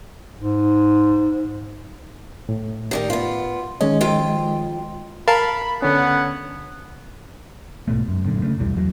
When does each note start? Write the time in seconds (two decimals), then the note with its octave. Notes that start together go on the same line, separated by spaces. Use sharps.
0.38 G#2
2.49 A2
2.91 D#3 G3 A#4
3.10 B3 F4
3.81 D#3 G#3 C#4 D#5
4.01 F2 F4 G5
5.28 A#4 F5 A5 B5
5.82 D3 B3 C#4 A4 C#5 F#5
7.88 B1 G#2 B2 A3
8.08 F#2
8.24 F#2 A#2 D3
8.42 C#3 A3
8.58 B1 E2 E3 G3
8.76 E2 F#3